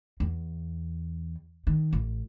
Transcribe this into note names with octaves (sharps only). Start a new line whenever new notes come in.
E2
D#3
A1